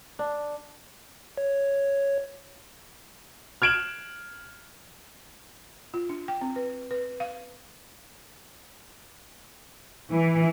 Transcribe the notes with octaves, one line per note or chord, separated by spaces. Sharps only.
D4
C#5
F6 G#6 D7 E7 F#7
F4
D4
G5
C4
B4
B4
F5
E3